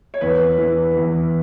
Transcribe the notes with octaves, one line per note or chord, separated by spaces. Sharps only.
C#5
E2 B4
E3
E2